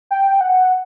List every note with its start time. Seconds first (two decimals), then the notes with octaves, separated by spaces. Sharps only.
0.11 G5
0.41 F#5